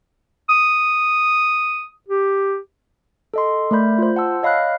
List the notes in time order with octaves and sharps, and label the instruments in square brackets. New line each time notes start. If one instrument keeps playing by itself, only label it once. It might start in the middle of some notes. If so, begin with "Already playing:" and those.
[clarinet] D#6
G4
[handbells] A4 D#5 C6
A3 A#4 D5 B5 G6
F4 C5
F#5 A5 E6
C#5 D#5 F5 B5 F6 F#6